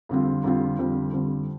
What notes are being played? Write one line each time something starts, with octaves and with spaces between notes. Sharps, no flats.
F2 D3 G3 C4 F4
F2 D3 G3 C4 F4
F2 D3 G3 C4 F4
F2 D3 G3 C4 F4